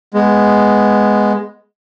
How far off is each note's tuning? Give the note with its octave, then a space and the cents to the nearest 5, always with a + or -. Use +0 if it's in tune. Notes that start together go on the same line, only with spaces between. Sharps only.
G#3 +0 B3 +0